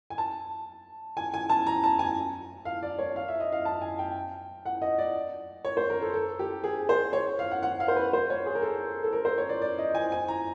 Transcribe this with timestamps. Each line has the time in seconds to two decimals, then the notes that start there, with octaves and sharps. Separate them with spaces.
0.10 G#5
0.18 A5
1.17 G#5
1.34 G#5
1.50 A5
1.67 A#5
1.84 A5
1.99 G#5
2.65 F5
2.83 D5
2.99 C#5
3.16 F5
3.28 E5
3.40 D#5
3.52 F5
3.65 A5
3.82 G#5
3.99 G5
4.65 F#5
4.82 D#5
4.98 D5
5.65 C#5
5.77 C5
5.90 A#4
6.02 A4
6.13 A4
6.39 G4
6.64 G#4
6.89 C5
7.13 C#5
7.39 F5
7.51 F#5
7.63 F#5
7.80 F5
7.88 C5
7.96 B4
8.13 C5
8.30 C#5
8.46 G#4
8.55 A#4
8.62 A4
9.04 A4
9.13 A#4
9.25 C5
9.38 C#5
9.49 D5
9.62 D5
9.79 D#5
9.95 G#5
10.12 G#5
10.28 A#5